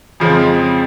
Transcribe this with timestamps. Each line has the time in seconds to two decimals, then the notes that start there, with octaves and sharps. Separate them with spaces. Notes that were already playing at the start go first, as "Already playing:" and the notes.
0.20 F2 C#3 F3 G#3 C4